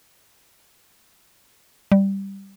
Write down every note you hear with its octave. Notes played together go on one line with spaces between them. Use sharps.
G3